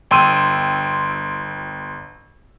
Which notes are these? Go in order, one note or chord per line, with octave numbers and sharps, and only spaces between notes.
G1 G5 C6 E6 D#7